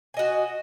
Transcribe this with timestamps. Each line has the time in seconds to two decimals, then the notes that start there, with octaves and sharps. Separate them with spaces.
0.14 G#5
0.17 D#5
0.19 F#4